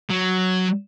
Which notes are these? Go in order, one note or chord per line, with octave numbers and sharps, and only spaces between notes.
F#3